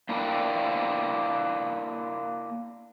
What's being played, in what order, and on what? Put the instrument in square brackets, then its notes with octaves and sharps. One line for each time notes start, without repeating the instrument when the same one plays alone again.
[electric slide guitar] A#3 D4 E4 A#4 F#5 G5